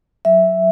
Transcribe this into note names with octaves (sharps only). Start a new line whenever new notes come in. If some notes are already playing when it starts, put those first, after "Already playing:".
F#3 E5